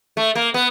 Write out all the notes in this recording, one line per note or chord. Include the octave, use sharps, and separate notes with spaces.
A3
A#3
B3